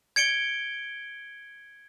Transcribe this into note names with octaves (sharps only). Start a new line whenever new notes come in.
G#6 C#7 D7 G7